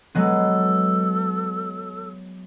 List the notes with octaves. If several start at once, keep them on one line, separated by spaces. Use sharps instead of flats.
F#3 G#3 B3 A4